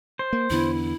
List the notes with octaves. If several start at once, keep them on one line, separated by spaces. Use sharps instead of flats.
C5
A#3
E2 D3 B3 E4